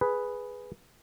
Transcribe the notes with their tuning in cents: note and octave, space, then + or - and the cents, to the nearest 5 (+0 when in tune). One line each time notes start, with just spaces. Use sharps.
G#4 +0 B4 +0